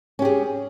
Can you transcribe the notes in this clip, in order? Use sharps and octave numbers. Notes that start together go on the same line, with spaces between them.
C#4 G4 G#4